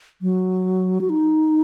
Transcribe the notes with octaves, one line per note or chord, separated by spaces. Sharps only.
F#3
F#4
D#4